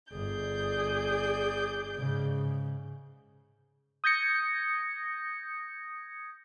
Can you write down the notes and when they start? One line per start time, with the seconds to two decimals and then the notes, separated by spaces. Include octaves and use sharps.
0.12 G1 G#4 D5 G6
1.95 G#2 C#3
4.04 D#6 G6 G#6 A#6 C#7